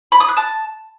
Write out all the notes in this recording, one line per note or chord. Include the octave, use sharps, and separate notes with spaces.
B5
D#6
F#6
A5